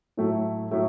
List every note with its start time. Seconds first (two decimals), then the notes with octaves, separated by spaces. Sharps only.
0.17 A2 F#3 A3 E4
0.71 A2 F#3 A3 E4